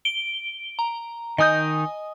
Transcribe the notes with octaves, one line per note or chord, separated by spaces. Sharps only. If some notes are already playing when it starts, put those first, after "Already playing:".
D7 G7
A#5
D#3 D#4 D#5 G#5 D#6 G6